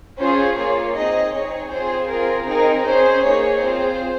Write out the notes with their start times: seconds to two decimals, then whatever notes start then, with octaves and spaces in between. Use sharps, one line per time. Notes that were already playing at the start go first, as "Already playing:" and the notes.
0.19 C#4 F4 G#4 C5
0.57 A#3 F4 G#4 C#5
0.96 C4 D#4 G#4 D#5
1.33 C4 D#4 G#4 C#5
1.72 C4 F4 G#4 C5
2.10 C4 F4 G#4 A#4
2.48 C4 D#4 G#4 A#4
2.87 C#4 G#4 C5
3.24 A#3 D#4 G#4 C#5
3.63 C4 F4 G#4 C5